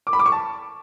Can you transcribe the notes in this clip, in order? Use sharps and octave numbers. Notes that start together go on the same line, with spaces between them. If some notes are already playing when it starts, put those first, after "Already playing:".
D6
B5
D6
C#6
A5